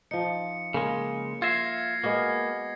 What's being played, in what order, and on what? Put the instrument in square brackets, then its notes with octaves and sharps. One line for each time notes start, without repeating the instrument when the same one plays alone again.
[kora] F3 D#4 [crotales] C#7
[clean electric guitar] C#3 G#3 [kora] A#3
[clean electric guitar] F4 E5 [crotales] G#6 A#6 C7
[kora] G#3 B3 F#4 [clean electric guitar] A#3